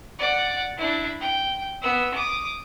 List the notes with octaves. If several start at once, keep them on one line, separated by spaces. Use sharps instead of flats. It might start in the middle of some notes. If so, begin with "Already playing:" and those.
D5 F#5
D4 E4
G5
B3 E6
D6 D#6